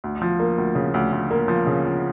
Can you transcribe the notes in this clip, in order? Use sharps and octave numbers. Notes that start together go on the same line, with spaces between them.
D2
F3
A#3
D2
C#3
D2
D2
A#3
F3
C#3
F3